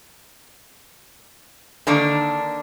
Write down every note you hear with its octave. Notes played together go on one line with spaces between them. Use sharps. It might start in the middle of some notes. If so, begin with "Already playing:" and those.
D3 D#3 A#3 D4